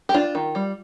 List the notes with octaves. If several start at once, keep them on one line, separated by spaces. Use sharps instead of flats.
G4
D4 F4
D#3
G3